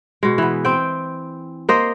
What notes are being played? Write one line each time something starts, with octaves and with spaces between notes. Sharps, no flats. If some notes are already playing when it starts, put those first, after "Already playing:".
B2 G#3
E3 B3
C4 G5
A#3 C5 D#5